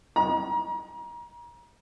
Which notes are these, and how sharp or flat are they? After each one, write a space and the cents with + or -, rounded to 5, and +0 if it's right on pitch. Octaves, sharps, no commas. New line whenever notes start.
A#5 +35